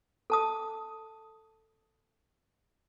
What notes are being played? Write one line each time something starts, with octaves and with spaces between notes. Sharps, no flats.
A4 A5 D#6